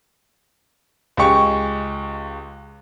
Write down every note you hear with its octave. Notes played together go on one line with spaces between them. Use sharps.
C#2 G#3 G4 C#6